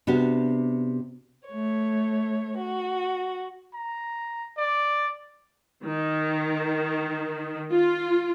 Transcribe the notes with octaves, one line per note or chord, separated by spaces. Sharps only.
C3 B3 D4 F#4 G4
A3 C#5
F#4
A#5
D5
D#3
F4